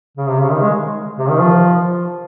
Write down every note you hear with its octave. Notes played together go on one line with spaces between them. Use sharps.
C#3
C3
C#3
D#3
G#3
C3
D#3
F3